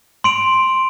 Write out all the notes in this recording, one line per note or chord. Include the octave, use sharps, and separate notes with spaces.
C6 D7 F7